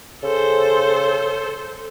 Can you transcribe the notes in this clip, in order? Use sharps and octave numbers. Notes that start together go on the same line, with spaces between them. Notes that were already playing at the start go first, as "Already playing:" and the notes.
C#3 A4 C5